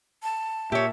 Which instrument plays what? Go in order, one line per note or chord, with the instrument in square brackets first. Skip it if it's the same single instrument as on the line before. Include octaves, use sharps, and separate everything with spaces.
[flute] A5
[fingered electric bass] A#2 [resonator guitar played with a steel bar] G4 C#5 [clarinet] E5